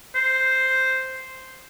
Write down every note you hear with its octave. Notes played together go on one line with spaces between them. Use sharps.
C5